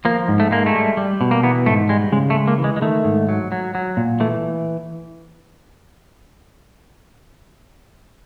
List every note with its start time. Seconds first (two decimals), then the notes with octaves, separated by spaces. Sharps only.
0.05 F3 A#3
0.28 G#2
0.40 A3
0.51 G#3 A#3
0.66 A3
0.75 G3
0.97 G3
1.21 B2
1.31 A#3
1.43 E3 B3
1.66 G#2 A3
1.89 G3 G#3
2.12 C#3 G#3
2.30 A3
2.35 G#3
2.48 A#3
2.58 E3
2.64 G#3
2.76 G#3
2.82 D#3 A3
3.04 G#2
3.29 F#3
3.52 F#3
3.75 F#3
3.97 A#2
4.20 E3 A3